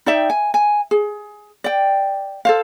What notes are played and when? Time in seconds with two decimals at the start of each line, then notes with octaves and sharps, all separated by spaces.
0.06 D#4 D5 E5 G5
0.30 G#5
0.54 G#5
0.91 G#4
1.64 D5 G5
2.45 A4 C5 F5